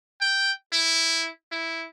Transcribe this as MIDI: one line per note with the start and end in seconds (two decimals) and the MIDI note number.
0.21 0.52 79
0.73 1.28 64
1.52 1.87 64